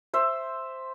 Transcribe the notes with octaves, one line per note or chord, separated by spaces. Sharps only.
C5 E5